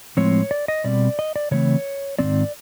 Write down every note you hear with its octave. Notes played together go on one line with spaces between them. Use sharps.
A2 F3 G#3 C4 C#5
D5
D#5
B2 G3 C4 D5
D#5
D5
C#3 E3 A3 C4 C#5
G#2 D#3 G#3 C4 D5